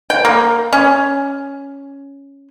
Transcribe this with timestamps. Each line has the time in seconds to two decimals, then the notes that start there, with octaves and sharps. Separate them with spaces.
0.10 G5
0.25 A#3
0.73 C#4